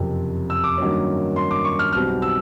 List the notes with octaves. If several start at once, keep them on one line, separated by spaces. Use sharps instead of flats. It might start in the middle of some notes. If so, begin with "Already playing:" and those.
Already playing: F#1 F2 C3
E6
D6
G2 D#3 F#3 A#3 C#4
C6
D6
C#6
F6
B1 B2 G3 C4 F6
E6